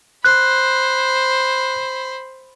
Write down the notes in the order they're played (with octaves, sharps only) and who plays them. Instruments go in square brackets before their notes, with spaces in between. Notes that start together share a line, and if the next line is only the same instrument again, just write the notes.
[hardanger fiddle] C5 B5 [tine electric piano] F#6